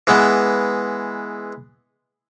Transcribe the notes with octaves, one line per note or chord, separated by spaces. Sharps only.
E3 G#3 B3